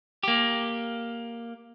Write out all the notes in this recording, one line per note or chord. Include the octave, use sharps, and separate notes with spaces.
A#3 G4